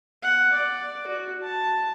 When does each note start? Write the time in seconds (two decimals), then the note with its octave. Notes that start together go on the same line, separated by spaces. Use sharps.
0.22 F#5
0.53 D5
1.07 F#4
1.43 A5